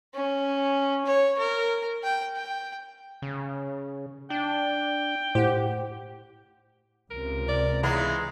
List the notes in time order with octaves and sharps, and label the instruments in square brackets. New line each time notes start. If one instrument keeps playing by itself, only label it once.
[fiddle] C#4
C#5
A#4
G5
G5
[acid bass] C#3
[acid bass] D4 [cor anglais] G5
[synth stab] A2 [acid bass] G4 [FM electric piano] C5 F#5
[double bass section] C#2 C3 [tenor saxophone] A#4
[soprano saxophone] D5
[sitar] C#3 E3 B3 [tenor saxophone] G#3 [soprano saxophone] A#5